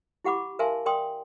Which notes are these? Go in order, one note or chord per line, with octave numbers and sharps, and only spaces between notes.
E4 G4 F#5 B5 D6
A#4 E5 F5 G#5 A5 C6
A#4 D5 G5 C6 D#6